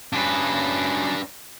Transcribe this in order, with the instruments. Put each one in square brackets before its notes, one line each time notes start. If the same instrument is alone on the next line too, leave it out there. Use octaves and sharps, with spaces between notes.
[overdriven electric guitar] C#3 F#3 [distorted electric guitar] D4 B4